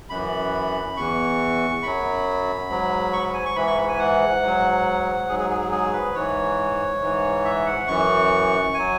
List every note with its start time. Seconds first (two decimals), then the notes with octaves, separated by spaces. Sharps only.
0.10 F#2 E3 B5
0.97 E2 E3 C#6
1.83 F#2 F#3 B5
2.70 G#2 F#3
3.13 C#6
3.24 B5
3.34 G#5
3.45 C#6
3.56 G#2 E3 B5
3.67 C#6
3.77 B5
3.89 G#5
3.99 F#5
4.42 G#2 F#3
5.29 G#2 F#3 G#4
5.39 G#4
5.50 G#4
5.61 G#4
5.72 G#4
5.93 B4
6.15 G#2 E3 C#5
7.01 G#2 E3
7.45 E5
7.66 F#5
7.88 F#2 E3 C#6
8.74 F#3 G#5